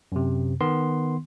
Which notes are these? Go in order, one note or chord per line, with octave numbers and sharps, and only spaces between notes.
F#2 C3
D#3 B3 C6